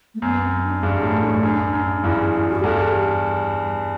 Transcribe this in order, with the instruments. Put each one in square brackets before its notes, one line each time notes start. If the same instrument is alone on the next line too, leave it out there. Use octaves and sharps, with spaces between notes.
[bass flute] A3
[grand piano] F#2 [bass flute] B3
[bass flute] C4
D4
[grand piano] E2 G2
F#2 A2
F#2 A2
F#2
F#2
[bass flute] D4
[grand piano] E2 G2 [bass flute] E4
[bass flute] F#4
G4
[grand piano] E2 G2 [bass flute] A4
[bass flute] G4
G3